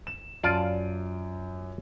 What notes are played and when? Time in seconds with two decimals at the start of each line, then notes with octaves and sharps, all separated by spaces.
0.07 E7
0.44 F#2 F4 D5 A5 D7 D#7